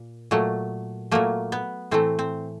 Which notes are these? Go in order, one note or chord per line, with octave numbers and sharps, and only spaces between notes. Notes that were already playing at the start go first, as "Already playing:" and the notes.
Already playing: A#2
A#2 F#3 A3
A#2 F#3 A3 A#3
B3
A2 E3 A3 C4
C4